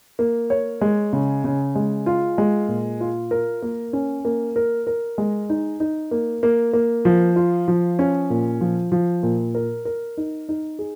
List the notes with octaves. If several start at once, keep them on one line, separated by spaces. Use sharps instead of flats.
A#3
C#5
G#3
C#3
C#3
G#3
F4
G#3
A#2
F4
A#4
A#3
C#4
A#3
A#4
A#4
G#3
D#4
D#4
A#3
A#3
A#3
F3
F4
F3
C#4
A#2
F3
F3
A#2
A#4
A#4
D#4
D#4
G#4